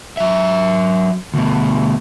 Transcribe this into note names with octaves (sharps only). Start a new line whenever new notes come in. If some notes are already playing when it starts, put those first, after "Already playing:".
F#3 E5
D2 B2